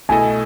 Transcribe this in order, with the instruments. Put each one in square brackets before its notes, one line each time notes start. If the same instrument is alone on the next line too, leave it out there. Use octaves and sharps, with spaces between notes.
[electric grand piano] B2 A3 E4 A4 D#5 [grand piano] G#5